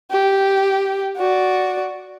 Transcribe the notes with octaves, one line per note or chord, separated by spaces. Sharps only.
G4
F#4 D5